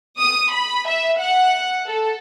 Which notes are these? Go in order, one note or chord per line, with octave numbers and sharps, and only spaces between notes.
D#6
B5
E5
F#5
A4